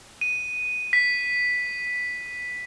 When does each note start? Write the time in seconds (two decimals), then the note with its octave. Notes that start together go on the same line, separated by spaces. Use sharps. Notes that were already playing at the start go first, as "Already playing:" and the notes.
0.21 D#7
0.93 B6